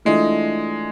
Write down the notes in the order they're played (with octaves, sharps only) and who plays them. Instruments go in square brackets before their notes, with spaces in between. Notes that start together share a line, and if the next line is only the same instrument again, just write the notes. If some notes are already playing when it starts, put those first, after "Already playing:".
[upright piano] E3 A3 D4 F4 [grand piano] G#3